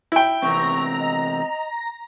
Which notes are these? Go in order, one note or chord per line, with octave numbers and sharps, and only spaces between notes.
E4 G5
E2 C3 C4 A#5 C#6
D#5